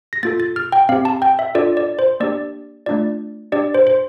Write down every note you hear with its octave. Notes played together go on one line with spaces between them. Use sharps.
A#6
A#3 F4 A4 A6
A6
F6
G5
C4 G4 F5
A5
G5
E5
D4 F4 A4 D5
D5
C5
A#3 D4 G4 D5
A3 D4 F4 D5
D4 G4 D5
C5
C5